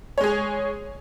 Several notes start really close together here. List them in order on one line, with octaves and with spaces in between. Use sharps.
C#5 G#3 G#4